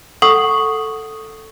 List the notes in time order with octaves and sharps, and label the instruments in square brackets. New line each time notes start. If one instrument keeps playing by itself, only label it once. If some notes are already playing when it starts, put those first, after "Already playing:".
[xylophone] A4 [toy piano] F#5 C#6 D#6